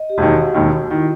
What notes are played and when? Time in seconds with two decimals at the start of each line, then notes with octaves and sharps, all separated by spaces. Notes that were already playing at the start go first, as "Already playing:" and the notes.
Already playing: D#5
0.10 G4
0.17 E1 D#2 D#3 F#4
0.54 E1 D#2 D#3
0.91 D#3 E4